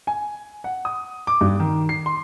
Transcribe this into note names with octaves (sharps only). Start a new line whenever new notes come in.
G#5
F#5
D#6
D6
G2
D#3
C7
C6